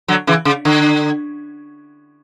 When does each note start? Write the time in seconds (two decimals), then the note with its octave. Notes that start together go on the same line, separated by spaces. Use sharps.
0.08 D3 F#3
0.27 C#3 E3
0.45 C#3
0.65 D3